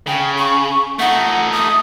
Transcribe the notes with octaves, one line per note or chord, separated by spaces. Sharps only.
C#3 G5
C#6
A3 D#4 F#5
D#6